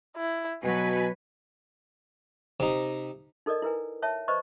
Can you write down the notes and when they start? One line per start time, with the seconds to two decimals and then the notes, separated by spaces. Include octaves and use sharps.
0.17 E4
0.64 B2 F#3 B4 G#5
2.60 C3 D#4
3.46 D#4 A4 A#4 D5 D#5
3.62 E4 A#4 B4 G#5
4.02 C#5 E5 A5
4.28 B4 C5 D5 D#5 A#5 C#6